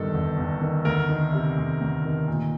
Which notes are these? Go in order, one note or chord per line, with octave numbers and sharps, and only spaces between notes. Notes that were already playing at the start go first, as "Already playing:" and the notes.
Already playing: G1 G2 D#3 A4
G1
G1
D#3
D2 A#4
D#3
C3
D2
D2
D#3
A#2